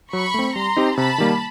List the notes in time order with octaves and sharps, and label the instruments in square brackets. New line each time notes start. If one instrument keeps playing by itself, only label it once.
[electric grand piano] F#3 [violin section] B5 C#6
[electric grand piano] A3 C4
[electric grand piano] G3 [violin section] A#5 C6
[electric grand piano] C4 D#4 G4
[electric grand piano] C3 [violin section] A5 B5
[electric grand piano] D#3 G3 A#3